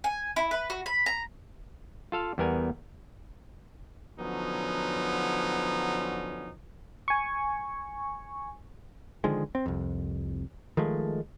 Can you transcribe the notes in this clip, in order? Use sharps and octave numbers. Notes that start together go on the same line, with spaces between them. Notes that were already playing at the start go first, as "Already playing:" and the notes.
G#5
E4
B4
F#4
B5
A#5
F4 A4 F5
E2 G3 B3 A#4 G#5
D3 F3 F#3 B3 C#4 D#4
G#5 C#6
D3 D#3 F3 G#3
C4
C2 F2
D#3 F3 G#3 A3